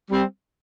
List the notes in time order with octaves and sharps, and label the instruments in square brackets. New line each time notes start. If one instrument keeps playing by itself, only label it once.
[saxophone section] G3 C4